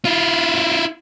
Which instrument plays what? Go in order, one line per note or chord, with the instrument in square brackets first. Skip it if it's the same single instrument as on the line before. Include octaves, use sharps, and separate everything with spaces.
[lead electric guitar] E4 F4